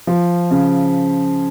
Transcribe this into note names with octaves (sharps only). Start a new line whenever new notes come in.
F3
C#3